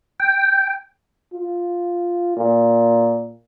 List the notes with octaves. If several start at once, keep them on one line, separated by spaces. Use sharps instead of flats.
G5
F4
A#2